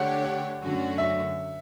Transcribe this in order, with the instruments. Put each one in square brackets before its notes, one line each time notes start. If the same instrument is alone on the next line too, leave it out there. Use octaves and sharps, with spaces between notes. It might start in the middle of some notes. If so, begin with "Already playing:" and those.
Already playing: [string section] D3 A3 D4 G4 C#5 [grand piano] F#5
[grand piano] F#5
[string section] F#2 D3 A3 C#4 F#4
[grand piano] E5